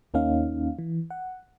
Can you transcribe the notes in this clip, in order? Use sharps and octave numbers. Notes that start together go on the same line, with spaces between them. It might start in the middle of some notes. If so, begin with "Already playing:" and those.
D#2 A#3 C#4 D#4 F5
E3
F#5